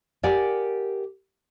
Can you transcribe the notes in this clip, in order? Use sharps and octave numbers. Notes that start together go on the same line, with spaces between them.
G4 A#4 D5 F#5 G#5